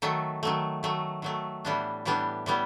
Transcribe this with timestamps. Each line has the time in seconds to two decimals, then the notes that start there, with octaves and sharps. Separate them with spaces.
0.02 D#3 F#3 A3
0.43 D#3 F#3 A3
0.83 D#3 F#3 A3
1.22 D#3 F#3 A3
1.65 A2 E3 G3 B3 D4
2.05 A2 E3 G3 B3 D4
2.46 A2 E3 G3 B3